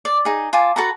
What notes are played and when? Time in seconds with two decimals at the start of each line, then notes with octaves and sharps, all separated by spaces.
0.05 D5
0.25 D#4 G#4
0.53 F4 G#5 A5 D6
0.76 F#4 A4 B4 A#5